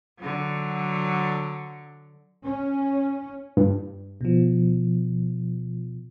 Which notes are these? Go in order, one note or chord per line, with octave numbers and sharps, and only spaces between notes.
D3 F#3
C#4
G2
B2 F3